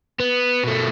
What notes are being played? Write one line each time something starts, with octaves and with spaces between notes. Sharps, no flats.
B3
B2 A3